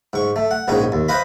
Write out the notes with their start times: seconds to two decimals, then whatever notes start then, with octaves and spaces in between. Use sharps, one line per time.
0.13 G#2 C#6
0.36 A3
0.51 F#5
0.68 A#1 G#2 C#3 D#4 C#5
0.92 D#2
1.08 B4 C5 D#5 F5 B5